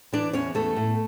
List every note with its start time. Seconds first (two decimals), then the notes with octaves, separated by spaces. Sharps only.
0.13 E3 D4 D5
0.33 E2 C#4 C#5
0.55 E2 A3 A4
0.76 A2